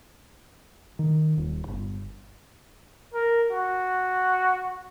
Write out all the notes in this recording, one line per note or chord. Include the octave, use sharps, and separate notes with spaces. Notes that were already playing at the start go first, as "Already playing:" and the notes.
D#3
D#1
G1
A#4
F#4